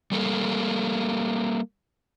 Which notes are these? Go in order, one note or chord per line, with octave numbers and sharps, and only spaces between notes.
G3 A#3 A4